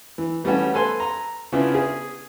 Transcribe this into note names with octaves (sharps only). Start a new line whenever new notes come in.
E3
E3 G3 A3 B3 C#4 F#4
A4 B4 G#5 C6
A#5
C#3 B3 C#4 D4 E4 F4
G#4